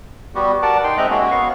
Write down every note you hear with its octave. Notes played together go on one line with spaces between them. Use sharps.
G3 B3 F#4 G4
A#4 D5 F#5 A5 D6
D#4 G5 C6
G#3 C4 D#5 E5 A#5 F#6
G#3 A#3 C#4 F#4
B3 F5 C#6